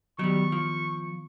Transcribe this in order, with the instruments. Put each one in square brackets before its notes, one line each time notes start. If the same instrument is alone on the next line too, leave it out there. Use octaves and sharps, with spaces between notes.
[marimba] D#3 B3 [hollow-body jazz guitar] F#3 G3 [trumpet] C#6
[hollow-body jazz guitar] F3